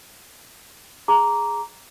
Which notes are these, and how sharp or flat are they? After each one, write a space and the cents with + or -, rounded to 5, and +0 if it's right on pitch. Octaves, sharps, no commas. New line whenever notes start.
G#4 +0 A#5 +0 D6 -15